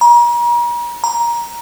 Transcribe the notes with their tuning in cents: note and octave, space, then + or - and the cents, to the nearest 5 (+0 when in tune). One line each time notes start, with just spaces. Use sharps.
A#5 +40
A#5 +15